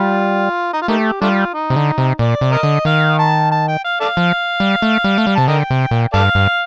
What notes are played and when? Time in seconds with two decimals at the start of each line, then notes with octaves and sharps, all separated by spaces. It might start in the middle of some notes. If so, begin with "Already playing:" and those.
Already playing: G3 F4
0.73 D#4
0.82 F4
0.88 A3 A#3 D#4 G4
1.21 G3 A3 D4 F4
1.54 D#4
1.70 C3
1.76 D3
1.98 C3
2.19 A#2 D5
2.41 C3
2.52 A#4 D#5
2.63 D3
2.85 D#3 F5
3.19 A5
3.51 A5
3.68 G5
3.84 F5
4.00 A4 D5 F5
4.17 F3
4.60 G3
4.82 A3
5.04 G3
5.18 A3
5.27 G3
5.36 C3 A5
5.48 D3 A#4 D#5 G5
5.70 C3
5.91 A#2
6.13 G2 A4 D5 F5
6.35 G2